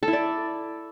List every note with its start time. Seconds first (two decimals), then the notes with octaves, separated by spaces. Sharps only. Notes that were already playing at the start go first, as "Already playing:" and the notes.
0.03 A4
0.08 E4
0.13 D5